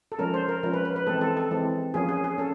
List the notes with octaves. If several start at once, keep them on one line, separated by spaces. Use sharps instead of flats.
A4
F3 G#3 C#4 A#4
C5
A#4
F3 G#3 C#4 A#4
B4
B4
B4
E3 G#3 C4 A4
A4
A4
E3 G#3 C4
F3 A#3 C#4 G#4
G#4
G#4
C#4 A4